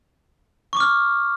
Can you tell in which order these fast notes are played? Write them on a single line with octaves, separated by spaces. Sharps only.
C#6 D6 F6